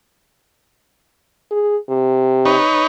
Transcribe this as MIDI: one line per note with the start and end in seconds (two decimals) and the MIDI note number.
1.51 1.77 68
1.89 2.56 48
2.45 2.87 63
2.45 2.87 71
2.45 2.87 73